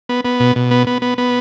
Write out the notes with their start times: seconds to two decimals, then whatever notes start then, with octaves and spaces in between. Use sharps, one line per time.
0.09 B3
0.25 B3
0.40 B2
0.56 B2
0.71 B3
0.87 B3
1.02 B3
1.18 B3